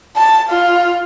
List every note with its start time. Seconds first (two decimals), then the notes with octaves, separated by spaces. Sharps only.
0.17 A5
0.50 F4